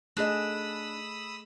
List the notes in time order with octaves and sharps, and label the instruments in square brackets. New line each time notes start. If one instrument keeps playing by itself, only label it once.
[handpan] A3 G#4 D#5 [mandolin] D4 [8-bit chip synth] B5 D#6 E6